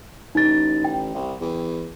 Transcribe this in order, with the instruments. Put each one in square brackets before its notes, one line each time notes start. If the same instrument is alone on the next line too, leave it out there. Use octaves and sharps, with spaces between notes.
[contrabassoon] A1 [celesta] D#4 A6
[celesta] G5
[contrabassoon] C2
E2